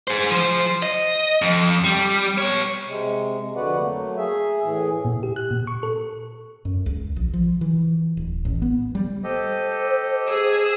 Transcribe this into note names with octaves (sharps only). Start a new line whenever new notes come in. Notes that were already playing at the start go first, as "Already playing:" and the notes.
G#4 C5
F3 C5
D#5
F2
G3
B3 C#5
C3 G#3
F2 D3 F#4 B4 D5 F#5
F#3 A3 A#3
G#4 E5
A2 E3 G#4
A#2
G4
F#6
A#2
C#6
A4
F#2
C#2
A#1
F3
E3
D1
A1
B3
G3
G4 A4 C5 D#5
G#4 D#6 E6